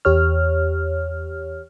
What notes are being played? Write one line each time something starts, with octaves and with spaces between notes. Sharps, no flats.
E2 G4 C#5 F6